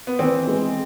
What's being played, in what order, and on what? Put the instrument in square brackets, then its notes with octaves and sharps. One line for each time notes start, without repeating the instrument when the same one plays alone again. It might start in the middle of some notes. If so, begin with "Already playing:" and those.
[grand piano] B3
[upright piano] E3 [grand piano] C4
[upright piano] G#3